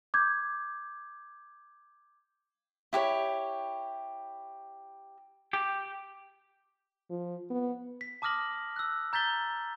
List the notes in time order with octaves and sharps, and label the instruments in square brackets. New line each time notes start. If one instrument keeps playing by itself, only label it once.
[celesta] D6 G6 G#6
[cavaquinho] E4 G4 B4 C#5
[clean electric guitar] G4
[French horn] F3
B3
[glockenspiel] B6
A5 D6 D#6 F6 A#6 F#7
E6 F#6
A#5 G6 A6 B6 G7